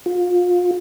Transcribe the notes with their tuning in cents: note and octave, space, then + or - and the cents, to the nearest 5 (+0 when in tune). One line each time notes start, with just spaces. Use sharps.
F4 +30